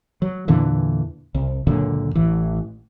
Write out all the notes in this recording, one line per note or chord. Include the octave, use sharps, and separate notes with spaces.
F#3
E2 A#2 D3 E3
C2
C#2 F#2 A#2 D3
A1 E3